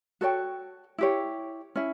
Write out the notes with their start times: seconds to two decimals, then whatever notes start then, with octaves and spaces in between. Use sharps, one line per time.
0.21 F#4 A4 C#5 G5
0.98 E4 G4 C#5
1.76 C#4 E4